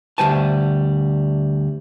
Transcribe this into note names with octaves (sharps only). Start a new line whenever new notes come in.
D2 G3 G#3 C5 G#5 A5